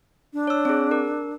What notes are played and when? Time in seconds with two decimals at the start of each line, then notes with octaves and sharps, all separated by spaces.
0.33 D4
0.47 C#5 E6
0.65 C4 G#4
0.91 A#4